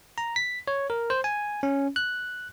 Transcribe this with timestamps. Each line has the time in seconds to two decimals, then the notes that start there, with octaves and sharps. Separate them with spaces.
0.18 A#5
0.36 B6
0.68 C#5
0.90 A#4
1.10 C5
1.24 G#5
1.63 C#4
1.96 F#6